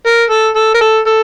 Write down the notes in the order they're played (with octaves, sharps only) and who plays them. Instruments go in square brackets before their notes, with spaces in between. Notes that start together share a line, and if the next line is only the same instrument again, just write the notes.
[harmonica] A#4
A4
A4
A#4
A4
A4